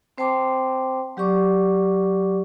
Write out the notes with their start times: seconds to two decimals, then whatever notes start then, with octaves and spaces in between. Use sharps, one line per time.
0.18 C4 C5 G5 A5 C6 D6
1.17 F#3 G4 D5 C#6 D6